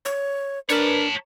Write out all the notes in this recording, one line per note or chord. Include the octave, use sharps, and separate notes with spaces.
C#5
D4 A#4 B4 C#5 A5